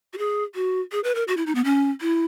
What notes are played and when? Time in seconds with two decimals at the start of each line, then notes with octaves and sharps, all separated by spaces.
0.13 F#4
0.18 G#4
0.55 F#4
0.92 G#4
1.04 B4
1.15 A#4
1.28 F#4
1.37 E4
1.47 D#4
1.55 B3
1.65 C#4
2.01 E4